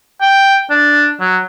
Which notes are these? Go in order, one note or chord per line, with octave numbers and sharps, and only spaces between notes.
G5
D4
F#3